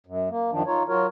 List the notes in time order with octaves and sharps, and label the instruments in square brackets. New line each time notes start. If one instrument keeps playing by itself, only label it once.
[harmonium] F#2
A#3
F#2 D#3 F3 D4
D#4 F4 C#5
F#3 F4 F#4 A#4 C#5